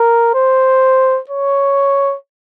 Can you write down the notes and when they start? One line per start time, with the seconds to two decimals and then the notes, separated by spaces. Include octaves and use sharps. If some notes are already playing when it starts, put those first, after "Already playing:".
Already playing: A#4
0.35 C5
1.30 C#5